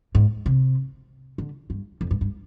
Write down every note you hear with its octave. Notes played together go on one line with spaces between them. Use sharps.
G#2
C3
D3
G2
F2
G2
G2